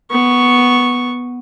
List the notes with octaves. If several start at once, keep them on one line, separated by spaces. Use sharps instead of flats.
B3 C#6